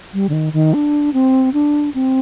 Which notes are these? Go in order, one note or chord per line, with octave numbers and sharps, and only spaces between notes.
G3
D3
D#3
D#3
D4
C4
D4
C4